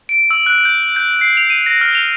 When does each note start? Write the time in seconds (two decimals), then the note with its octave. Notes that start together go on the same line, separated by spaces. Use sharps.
0.09 D7
0.31 E6
0.46 F#6
0.65 G6
0.96 G6
1.21 C7
1.37 F7
1.50 D#7
1.66 A#6
1.81 F6
1.95 F7